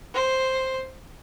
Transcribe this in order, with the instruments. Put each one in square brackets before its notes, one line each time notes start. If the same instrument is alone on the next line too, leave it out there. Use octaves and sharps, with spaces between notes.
[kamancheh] C5